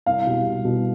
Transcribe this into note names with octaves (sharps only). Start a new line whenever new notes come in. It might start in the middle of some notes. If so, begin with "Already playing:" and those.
C2 F5
B2 G3
C2
B2 G3